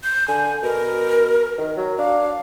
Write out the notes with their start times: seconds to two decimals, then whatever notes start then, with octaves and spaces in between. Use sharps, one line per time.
0.04 G6
0.28 D3 G#5
0.63 B2 A#4
1.58 D#3
1.76 F#3
1.98 D4 F5